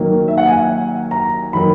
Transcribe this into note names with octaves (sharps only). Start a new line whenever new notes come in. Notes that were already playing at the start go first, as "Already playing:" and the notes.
Already playing: D#3 F#3 A#3
E5
F#5
G#5
A#5
D#3 F#3 A#3 B5